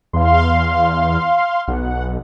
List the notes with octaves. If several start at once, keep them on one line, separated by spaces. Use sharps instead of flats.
E2 F5 C6
B1 F#5